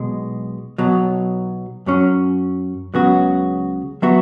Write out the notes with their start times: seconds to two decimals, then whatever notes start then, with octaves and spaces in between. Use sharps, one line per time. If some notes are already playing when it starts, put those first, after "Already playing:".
Already playing: B1 B2 G#3
0.78 B1 B2 F#3
1.86 F#2 F#3 C#4
2.94 C#2 C#3 F#3 B3 F#4
4.02 F#3 B3 F#4 E5